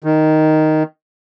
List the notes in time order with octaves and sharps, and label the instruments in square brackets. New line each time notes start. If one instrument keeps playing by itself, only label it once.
[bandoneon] D#3